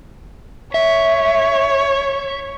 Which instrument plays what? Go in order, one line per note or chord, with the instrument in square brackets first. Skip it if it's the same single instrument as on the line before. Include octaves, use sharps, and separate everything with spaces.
[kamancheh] C#5 [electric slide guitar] E5